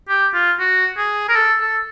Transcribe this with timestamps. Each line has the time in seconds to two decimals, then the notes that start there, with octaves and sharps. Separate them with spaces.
0.09 G4
0.34 F4
0.60 F#4
0.98 G#4
1.29 A#4
1.35 A4
1.60 A4